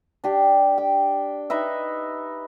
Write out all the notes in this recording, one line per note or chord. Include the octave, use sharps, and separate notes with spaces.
D4 G4
G5
D#4 B4 D#5 E5